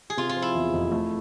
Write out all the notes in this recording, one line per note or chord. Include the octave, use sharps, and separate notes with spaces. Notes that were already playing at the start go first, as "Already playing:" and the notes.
G#4
C3 F4
F4
F3
E4
E2
F1
A3